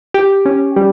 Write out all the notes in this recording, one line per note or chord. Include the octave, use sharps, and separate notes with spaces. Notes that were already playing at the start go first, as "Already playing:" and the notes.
G4
C#4
G3